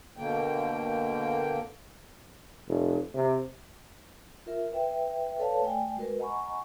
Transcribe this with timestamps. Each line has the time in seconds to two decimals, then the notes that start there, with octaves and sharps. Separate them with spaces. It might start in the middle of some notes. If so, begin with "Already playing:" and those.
0.17 B2 D3 A#3 G5
2.68 F1
3.14 C3
4.46 F4 A#4 E5
4.72 B4 E5 G5
5.38 A4 B4 C#5 D5 F5 A5
5.62 A3 D5 G5 G#5
5.97 G#3 F#4 A#4 B4
6.19 D#5 F#5 G#5 A#5 B5 C#6